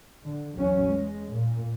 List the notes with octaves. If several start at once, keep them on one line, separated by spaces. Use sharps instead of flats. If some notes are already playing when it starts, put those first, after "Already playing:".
D3
E2 F#3 C#4
G#3
A#2